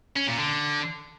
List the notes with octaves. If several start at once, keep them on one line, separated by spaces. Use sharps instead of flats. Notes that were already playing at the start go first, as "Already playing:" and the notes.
C#4
A#2
D3